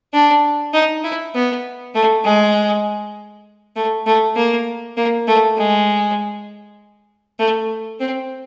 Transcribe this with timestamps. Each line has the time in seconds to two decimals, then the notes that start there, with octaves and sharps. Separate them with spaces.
0.13 D4
0.73 D#4
1.04 E4
1.34 B3
1.94 A3
2.24 G#3
3.76 A3
4.06 A3
4.36 A#3
4.97 A#3
5.27 A3
5.57 G#3
7.39 A3
8.00 C4